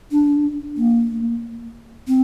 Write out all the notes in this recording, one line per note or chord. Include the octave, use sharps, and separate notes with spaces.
D4
A#3
C4